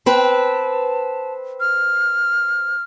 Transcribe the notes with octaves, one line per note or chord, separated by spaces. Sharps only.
C4 B4 A5
F6